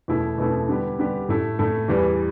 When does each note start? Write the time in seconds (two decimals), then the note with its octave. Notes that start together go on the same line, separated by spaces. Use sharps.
0.08 E2 B2 A3 E4 A4
0.38 E2 B2 A3 E4 A4
0.69 D3 G3 B3 G4
0.99 D3 G3 B3 G4
1.29 A2 A3 E4 A4
1.59 A2 A3 E4 A4
1.88 E2 E3 G3